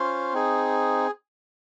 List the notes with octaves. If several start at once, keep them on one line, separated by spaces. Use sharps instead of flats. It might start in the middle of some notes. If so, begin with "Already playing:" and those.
Already playing: C#4 F4 C5
C4 D#4 G#4